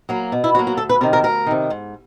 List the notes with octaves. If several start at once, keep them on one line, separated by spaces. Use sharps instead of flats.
F#3 A#3
B2
E4
F#3 A#3 F#4
F#4
D2 A4
B4
C3 D#3 A#4
A#4
D2 A#4
C3 D#3
G#2